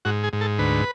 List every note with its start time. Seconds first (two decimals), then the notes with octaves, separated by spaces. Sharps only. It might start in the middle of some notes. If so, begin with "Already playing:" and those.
0.05 G#2 F#4
0.24 G#4
0.33 G#2
0.41 A4
0.59 D2 B4